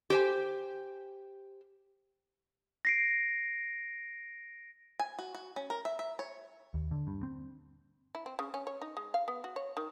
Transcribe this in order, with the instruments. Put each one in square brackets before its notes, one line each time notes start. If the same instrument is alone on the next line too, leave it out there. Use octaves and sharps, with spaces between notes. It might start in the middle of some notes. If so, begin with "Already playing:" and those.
[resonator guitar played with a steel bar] G4 C5 G#5
[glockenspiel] A#6 C7 D7
[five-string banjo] G#5
F#4
F#4
C#4
A#4
E5
E5
C#5
[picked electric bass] D#2
D3
G2
C4
[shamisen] E4
C4
C#3
C#4
C#5
D#4
G#3
F5
B3
F#4
C#5
D#3